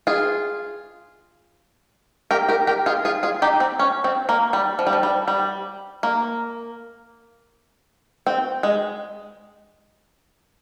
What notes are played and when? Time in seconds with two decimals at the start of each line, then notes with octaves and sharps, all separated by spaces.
0.07 F4 G#4
2.31 G4 A#4
2.48 G4 A#4
2.67 G4 A#4
2.86 F4 G#4
3.05 F4 G#4
3.23 F4 G#4
3.42 D#4 G4
3.60 C4
3.79 C#4
4.04 C4
4.29 A#3
4.53 G3
4.79 F3
4.87 G3
4.93 F3
5.03 G3
5.28 G3
6.03 A#3
8.27 C4
8.63 G#3